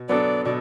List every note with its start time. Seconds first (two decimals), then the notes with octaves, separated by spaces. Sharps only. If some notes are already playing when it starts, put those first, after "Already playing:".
Already playing: B2
0.08 F#3 B3 D4 A4 D5
0.45 B2 D5